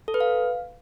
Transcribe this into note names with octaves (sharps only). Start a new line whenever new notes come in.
A4
B4
F5